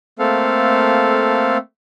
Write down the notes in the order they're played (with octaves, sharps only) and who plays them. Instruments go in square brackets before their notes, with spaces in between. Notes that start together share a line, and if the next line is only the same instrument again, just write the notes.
[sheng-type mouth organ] A3 A#3 C4 A4 F5